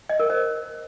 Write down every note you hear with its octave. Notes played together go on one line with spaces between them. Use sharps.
D#5
A#4
C5